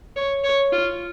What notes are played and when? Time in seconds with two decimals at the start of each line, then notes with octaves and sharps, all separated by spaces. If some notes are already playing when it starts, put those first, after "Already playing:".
0.16 C#5
0.44 C#5
0.72 F4